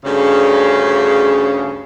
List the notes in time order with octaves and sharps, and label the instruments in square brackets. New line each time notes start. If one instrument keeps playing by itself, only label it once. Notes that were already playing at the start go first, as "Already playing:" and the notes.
[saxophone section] D2 G2 C#3